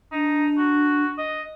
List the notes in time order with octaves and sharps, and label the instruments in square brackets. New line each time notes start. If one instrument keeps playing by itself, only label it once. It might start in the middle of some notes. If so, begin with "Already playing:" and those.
[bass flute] D4 [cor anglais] D#4
[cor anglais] F#4
D#5